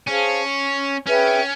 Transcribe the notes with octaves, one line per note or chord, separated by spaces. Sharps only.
C#4 G#4 C5 F5 A5
C#4 G#4 B4 E5 G5